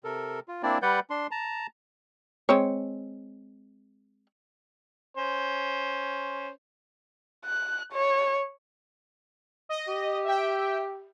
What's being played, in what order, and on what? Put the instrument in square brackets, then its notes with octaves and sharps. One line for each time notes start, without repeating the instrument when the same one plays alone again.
[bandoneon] C3 A4 A#4
F4
A#3 C4 D4 E4 D5
G3 B4 D5 F#5 G6
D4 C6
A5 A#5
[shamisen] G#3 C4 C#5
[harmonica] C#4 C5
[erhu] F#6
C#5
[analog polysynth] D#5
[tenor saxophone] G4
[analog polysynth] E5 G5